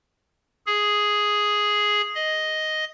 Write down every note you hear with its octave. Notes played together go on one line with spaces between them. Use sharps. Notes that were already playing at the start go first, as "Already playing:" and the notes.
G#4
D#5